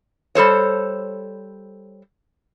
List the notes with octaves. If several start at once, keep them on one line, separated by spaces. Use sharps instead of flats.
G3 A4 C5 C#5